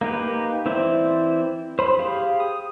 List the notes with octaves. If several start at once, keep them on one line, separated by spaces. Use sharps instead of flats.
A#3 D#4 G4 B4
E3 C4 E4 C5 D5
C5 B5
G4 G#4 F5 B5
D#6